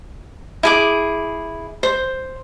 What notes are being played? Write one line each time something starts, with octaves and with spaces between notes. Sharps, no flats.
E4 G#4 D6
C5